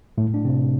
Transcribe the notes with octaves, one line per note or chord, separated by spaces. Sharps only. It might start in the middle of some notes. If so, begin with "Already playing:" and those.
A2 A3
D4
C3 C4